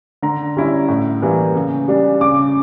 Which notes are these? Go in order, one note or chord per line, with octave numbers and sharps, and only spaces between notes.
D3 A#5
G3 C#4 E4
A2
E3 G3 A#3
C#3
G3 D4
C#3 D6